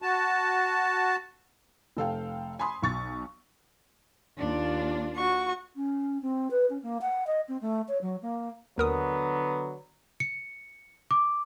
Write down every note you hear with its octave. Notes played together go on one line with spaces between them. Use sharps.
F#4 A5
F1 A4 F5 G5
G#5 B5 C6 D#6
B1 C#6 A6
D#2 D4 F4
F#4 C#6
C#4
C4
B4
C#4
A#3
F#5
D#5
C4
A3
C#5
F#3
A#3
D#2 D3 F#3 B3 A#4 D#6
C#7
D6